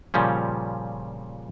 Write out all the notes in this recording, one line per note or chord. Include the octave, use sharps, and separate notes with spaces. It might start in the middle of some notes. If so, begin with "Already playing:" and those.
A#2 C#3 F3 G3 C#4